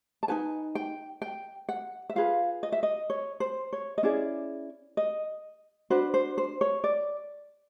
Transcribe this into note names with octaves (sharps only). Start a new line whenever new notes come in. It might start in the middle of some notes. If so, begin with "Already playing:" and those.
A5
D#4 F#4 B4 G#5
G5
G5
F#5
E5
F4 G#4 B4 F5
D#5
E5
D#5
C#5
C5
C#5
D#5
C#4 E4 G#4 D5
D#5
D4 F#4 B4 C5
C5
C5
C#5
D5